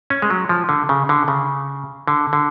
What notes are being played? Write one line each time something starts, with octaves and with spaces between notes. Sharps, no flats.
C#4
G#3
F#3
F3
D3
C#3
D3
C#3
D3
D3